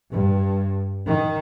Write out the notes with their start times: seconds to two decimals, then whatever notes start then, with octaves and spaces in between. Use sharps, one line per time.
0.11 G2
1.07 D#3